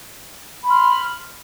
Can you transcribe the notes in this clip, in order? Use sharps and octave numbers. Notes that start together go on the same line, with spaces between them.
B5 C6 F6